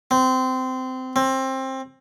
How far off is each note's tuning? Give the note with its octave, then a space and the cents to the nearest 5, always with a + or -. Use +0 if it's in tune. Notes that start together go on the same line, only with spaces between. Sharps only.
C4 -20
C4 +20